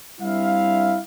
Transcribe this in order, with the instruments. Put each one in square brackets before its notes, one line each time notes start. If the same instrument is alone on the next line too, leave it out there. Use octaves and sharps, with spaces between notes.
[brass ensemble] G3 C4 D4 E4 E5 F5